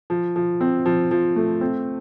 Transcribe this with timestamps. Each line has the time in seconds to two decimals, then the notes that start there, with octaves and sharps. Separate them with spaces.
0.10 F3
0.36 F3
0.61 C4
0.86 F3
1.11 F3
1.36 A3
1.61 C4